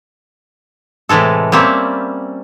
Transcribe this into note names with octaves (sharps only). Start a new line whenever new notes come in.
A2 C3 E3 G#3 A4
G3 A#3 C4 C#4 E5